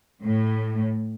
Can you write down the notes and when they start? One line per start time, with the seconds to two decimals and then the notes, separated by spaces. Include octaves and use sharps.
0.23 A2